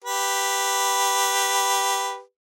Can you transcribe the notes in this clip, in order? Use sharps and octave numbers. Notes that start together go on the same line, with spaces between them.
G4 B4